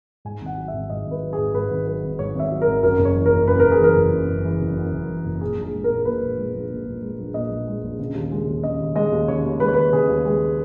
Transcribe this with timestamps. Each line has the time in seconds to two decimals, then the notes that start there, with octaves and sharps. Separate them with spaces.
0.25 G#2 G#5
0.41 G#1
0.46 F#5
0.57 F#3
0.68 E5
0.74 G#1
0.90 G#2 D#5
1.06 G#1
1.11 B4
1.22 F#3
1.33 G#4
1.38 G#1
1.54 G#2 B4
1.70 G#1
1.87 F#3 B4
2.03 G#1
2.19 G#2 C#5
2.35 G#1 E5
2.51 F#3
2.62 A#4
2.67 G#1
2.83 F#2 A#4
2.99 F#1
3.05 C#5
3.16 E3
3.26 A#4
3.32 F#1
3.48 F#2 B4
3.60 F#1 A#4
3.71 G#4
3.80 E3 A#4
3.96 F#1
4.12 F#2
4.28 F#1
4.44 E3
4.61 F#1
4.76 F#2
4.93 F#1
5.09 E3
5.25 F#1
5.41 A#2 G#4
5.57 A#1
5.63 G#4
5.73 G#3
5.84 A#4
5.90 A#1
6.05 A#2 B4
6.22 A#1
6.38 G#3
6.54 A#1
6.70 A#2
6.86 A#1
7.02 G#3
7.19 A#1
7.34 A#2 D#5
7.50 A#1
7.67 G#3
7.83 A#1
7.99 C#3
8.15 D#2
8.32 G#3
8.47 D#2
8.63 C#3 D#5
8.80 D#2
8.95 G#3 D#5
9.12 D#2
9.28 C#3 C#5
9.45 D#2
9.60 G#3 B4
9.68 C#5
9.74 D#2 B4
9.93 C#3 G#4
10.08 D#2
10.25 G#3 G#4